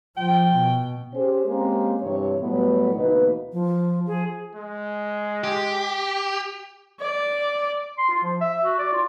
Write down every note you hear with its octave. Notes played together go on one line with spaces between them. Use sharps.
F3 G5
B2
C#4 G4 G#4 C5
G#3 A#3 C4 C#4 G4 A#4
G2 C3 E3 C#5
A2 F#3 G3 A3 B3
D2 B2 E3 A#3 D#4 B4
F3
F3 G#4
G#3
G4
D5
C6
F4
F3
E5
F#4
D5
F4